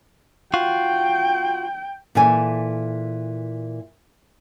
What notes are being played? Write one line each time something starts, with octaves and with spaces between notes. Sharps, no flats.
F4 F#4 G5
A#2 E3 A4 G#5